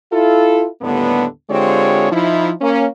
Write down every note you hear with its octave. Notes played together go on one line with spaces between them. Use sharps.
E4 F4 A4
D#2 A2 D3 G3 B3
D3 G#3 C4 F4 G4 C#5
F3 D#4 E4
A#3 C#4